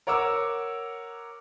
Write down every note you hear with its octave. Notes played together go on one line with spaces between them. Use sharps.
A#4 C#5 F#5 D6 E6